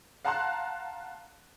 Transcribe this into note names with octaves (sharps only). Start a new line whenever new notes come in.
F5 F#5 A5 A#5 C6 F#6